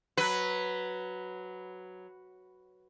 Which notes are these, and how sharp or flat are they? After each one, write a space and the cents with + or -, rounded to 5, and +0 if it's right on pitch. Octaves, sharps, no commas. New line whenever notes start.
F#3 +0 B4 +0